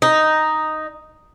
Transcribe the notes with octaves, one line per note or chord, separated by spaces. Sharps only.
D#4